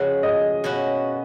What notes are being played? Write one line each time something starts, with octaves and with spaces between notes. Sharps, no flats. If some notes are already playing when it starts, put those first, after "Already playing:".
Already playing: F2 C#3 G#3 C#4 F#4
D#5
B2 A#3 C#4 F#4